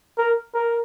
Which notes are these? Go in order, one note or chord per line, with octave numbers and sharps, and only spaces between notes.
A#4
A#4